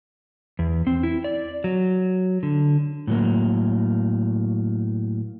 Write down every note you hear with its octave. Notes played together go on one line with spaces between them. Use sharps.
E2
C4
E4
D5
F#3
D3
A2 F#3 A#3